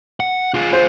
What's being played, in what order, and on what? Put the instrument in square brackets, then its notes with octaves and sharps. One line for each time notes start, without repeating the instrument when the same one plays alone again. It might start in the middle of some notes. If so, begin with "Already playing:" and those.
[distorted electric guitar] F#5
F4 G#4
[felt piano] C5